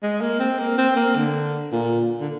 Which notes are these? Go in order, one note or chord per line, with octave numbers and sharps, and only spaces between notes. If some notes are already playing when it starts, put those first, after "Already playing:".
G#3
A#3
C4
A#3
C4
A#3
D3
A#2
D3